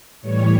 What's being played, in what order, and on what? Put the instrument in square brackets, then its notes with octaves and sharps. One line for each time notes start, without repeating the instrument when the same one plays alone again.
[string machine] A2 E3 G3 C#5